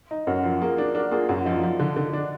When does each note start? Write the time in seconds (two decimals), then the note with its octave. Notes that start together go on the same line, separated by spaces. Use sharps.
0.11 D#4
0.27 F#2 F#4 A#4
0.44 F3
0.60 A#3 F4 G#4
0.78 D4
0.95 D4 F#4 A#4
1.11 A#3 F4 G#4
1.29 F#2 F#4
1.37 F4
1.44 F3 D#4
1.51 D4 F4
1.63 F3
1.79 D3
1.96 D3
2.13 D4